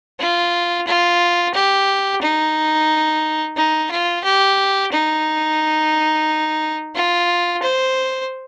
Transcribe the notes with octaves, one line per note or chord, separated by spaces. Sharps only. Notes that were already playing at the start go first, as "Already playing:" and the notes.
F4
F4
G4
D#4
D#4
F4
G4
D#4
F4
C5